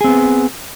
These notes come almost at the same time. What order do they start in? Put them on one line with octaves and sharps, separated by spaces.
G#4 C4 B3